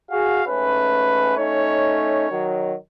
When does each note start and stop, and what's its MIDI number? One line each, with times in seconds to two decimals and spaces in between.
0.11 0.41 66
0.11 0.41 68
0.11 0.42 77
0.46 1.33 44
0.46 1.33 57
0.46 1.33 61
0.46 1.34 71
1.37 2.29 57
1.37 2.29 61
1.37 2.29 63
1.37 2.50 73
2.30 2.74 51
2.30 2.74 54